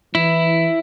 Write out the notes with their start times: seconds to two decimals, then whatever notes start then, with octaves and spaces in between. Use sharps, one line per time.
0.15 E3 E4